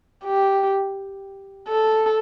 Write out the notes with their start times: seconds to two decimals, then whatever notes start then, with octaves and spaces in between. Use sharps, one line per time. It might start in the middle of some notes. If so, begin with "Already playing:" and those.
0.25 G4
1.68 A4